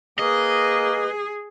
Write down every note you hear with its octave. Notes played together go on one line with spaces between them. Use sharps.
A#3 G#4 B4 D#5